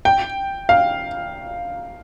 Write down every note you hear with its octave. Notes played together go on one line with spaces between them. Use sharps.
G5
F5